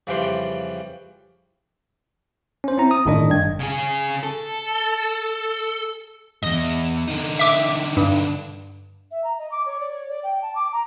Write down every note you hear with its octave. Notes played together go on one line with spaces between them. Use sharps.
F2 C#3 E3 G3 G5 C6
C#4 C5
C4 E4 A#5
D#6
G1 A2 D#3 D4 D#5
G2 G#6
C#3 G#4
A4
E2 G2 D#5
D3 D#4
E5 D6
G2
E5
A#5
D#5
D6
C#5
D5
C#5
D5
G5
A5
D6
A#5